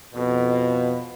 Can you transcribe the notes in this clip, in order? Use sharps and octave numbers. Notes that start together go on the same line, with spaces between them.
F2 B2